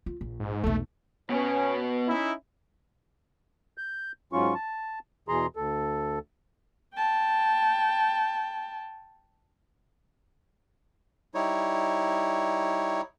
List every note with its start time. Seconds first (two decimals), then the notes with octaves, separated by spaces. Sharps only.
0.06 F4
0.21 A#1
0.40 G#2
0.64 B1 E2 A3
1.30 B2 B3 C#4
2.07 C#4 D#4 E4
3.78 G6
4.33 G#2 F#3 C#4 F4 C#6
4.54 A5
5.28 E2 B2 E3 G#4 A#5 C6
5.56 D2 A4
6.95 G5 A5
11.35 G3 D#4 E4 C#5